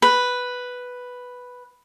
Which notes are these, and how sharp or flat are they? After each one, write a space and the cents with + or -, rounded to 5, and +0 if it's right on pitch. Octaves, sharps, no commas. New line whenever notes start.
B4 +0